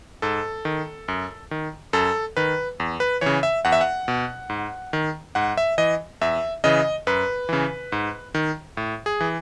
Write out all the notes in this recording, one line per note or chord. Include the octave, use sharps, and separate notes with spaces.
G#2 A4
D#3
F#2
D#3
F#2 A4
D#3 B4
E2
B4
C#3 E3 C#5
E5
E2 F#5
E5
F#5
B2
G#2
D#3
G#2 F#5
E5
E3 D#5
E2 E5
C#3 E3 D#5
F#2 B4
C#3 E3
G#2
D#3
A2
G#4
E3